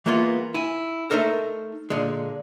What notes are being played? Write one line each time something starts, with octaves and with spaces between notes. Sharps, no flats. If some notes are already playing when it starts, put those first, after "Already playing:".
E3 G#3 A#3 B3 F4 C6
E4 G#5
A3 B3 D#4 A4 A#4 C5
A#2 D3 G#3